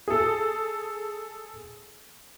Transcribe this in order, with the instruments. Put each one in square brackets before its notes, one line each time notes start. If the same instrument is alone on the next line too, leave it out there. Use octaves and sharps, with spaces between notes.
[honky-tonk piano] G#4 A4